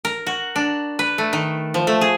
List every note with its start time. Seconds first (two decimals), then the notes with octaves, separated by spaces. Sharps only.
0.05 A#4
0.27 F#4
0.56 D4
0.99 B4
1.18 A3
1.33 D#3
1.74 F3
1.87 A3
2.01 G#4